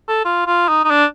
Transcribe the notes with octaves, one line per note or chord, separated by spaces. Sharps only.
A4
F4
F4
D#4
D#4
D4